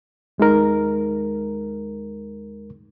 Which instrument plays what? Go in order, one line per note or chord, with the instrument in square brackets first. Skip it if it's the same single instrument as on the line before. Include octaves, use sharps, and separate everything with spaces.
[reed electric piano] D#2 G#3 D#4 A#4